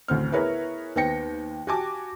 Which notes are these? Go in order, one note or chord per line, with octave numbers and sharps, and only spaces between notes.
A1 D2 C4 F6
B3 E4 G#4 A#4 B4 C#5
D#2 B3 C5 G5 A#6 C#7
F#4 G4 G#5 A5 D6